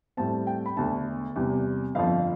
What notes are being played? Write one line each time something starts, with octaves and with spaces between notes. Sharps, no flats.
A2 G3 C4 A5
G5
B5
E1 D2 D3 A5
E2 C3 G3
G1 F2 D3 F3 F5